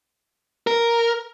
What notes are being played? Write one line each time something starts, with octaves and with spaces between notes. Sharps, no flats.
A#4